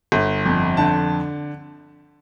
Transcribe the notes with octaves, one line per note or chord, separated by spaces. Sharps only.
G1
F2
D3 A5